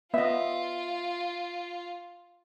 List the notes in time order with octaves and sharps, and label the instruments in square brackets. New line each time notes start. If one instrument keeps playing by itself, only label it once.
[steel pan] B3 D#5 [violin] F4 [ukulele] E5